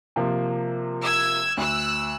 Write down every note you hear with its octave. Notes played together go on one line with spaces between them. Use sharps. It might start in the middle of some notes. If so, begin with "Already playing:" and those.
C3 F3 A#3
E6 G#6
D2 E6 F#6